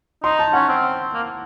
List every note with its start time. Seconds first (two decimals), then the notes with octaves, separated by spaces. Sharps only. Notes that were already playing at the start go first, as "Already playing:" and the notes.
0.24 D#4 C6
0.39 A5
0.53 C#4 F#5
0.69 C4
1.14 A#3